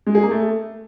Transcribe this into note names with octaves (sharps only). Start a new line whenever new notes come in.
G#3
G#4
A#3
A3